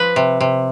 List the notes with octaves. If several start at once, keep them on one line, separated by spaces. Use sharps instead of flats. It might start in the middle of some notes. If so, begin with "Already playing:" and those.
Already playing: F3 B4
C3
C3